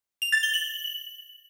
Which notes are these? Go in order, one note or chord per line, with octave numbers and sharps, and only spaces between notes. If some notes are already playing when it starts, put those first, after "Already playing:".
F7
A6
G7
F#7